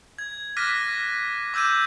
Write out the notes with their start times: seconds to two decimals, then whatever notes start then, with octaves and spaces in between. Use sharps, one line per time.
0.18 G#6
0.57 D6 F6 F#6 A#6 B6 D#7
1.54 D6 E6 G6 G#6 D#7